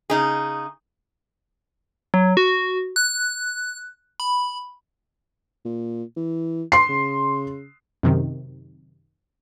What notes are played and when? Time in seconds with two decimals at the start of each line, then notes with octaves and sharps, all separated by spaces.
0.10 C#3 D#4 G#4
2.14 F#3
2.37 F#4
2.96 F#6
4.20 B5
5.65 A#2
6.16 E3
6.72 C6 C7
6.89 C#3
8.03 F#2 C3 D#3